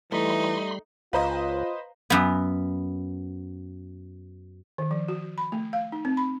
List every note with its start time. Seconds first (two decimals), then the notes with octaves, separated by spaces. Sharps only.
0.12 E3 G3 A3 D#4 B5 C6
1.13 C#2 F4 B4 C5 D#5 F5 A#5
2.10 F#2 B3
4.78 D#3
4.91 F3
5.08 F#4
5.38 B5
5.52 A3
5.73 F5
5.92 D#4
6.05 C4
6.17 B5